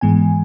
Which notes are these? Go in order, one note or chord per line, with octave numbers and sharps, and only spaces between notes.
G#2 E3 G#3 B3 G#5